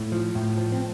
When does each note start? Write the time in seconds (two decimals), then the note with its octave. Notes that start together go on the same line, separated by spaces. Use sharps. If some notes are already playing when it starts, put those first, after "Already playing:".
Already playing: A2
0.12 F3
0.35 A2
0.58 F3
0.72 C4